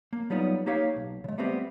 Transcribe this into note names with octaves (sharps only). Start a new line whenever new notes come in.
A#3
F#3 G3 B3 D#4 F4
A#3 D#4 G4 C#5 F5
B1
C#3 G#3
G3 A3 B3 C4 F#4 G4